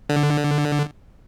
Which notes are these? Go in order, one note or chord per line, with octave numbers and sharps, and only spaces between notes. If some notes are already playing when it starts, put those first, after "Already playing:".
D3